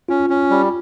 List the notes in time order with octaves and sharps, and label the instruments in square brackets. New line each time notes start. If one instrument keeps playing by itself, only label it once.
[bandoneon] C#4 [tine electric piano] F4
[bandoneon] C#4
G3